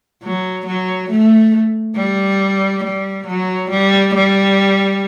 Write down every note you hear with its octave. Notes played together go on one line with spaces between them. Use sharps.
F#3
F#3
A3
G3
G3
F#3
G3
G3